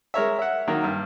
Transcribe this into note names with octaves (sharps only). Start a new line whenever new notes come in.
G#3 A#4 C#5 E5
E5 F#5
D#3 F#3 A#3
G2